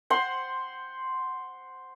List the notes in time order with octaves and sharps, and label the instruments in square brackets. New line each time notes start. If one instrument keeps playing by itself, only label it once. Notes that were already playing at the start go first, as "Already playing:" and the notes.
[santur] C5 F#5 C6